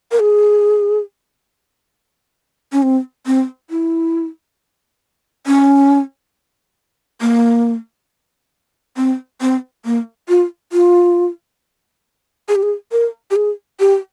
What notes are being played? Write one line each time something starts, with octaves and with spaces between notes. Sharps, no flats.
A#4
G#4
C#4
C4
C4
E4
C#4
A#3
C4
C4
A#3
F4
F4
G#4
G4
G#4
A#4
G4
G#4
G4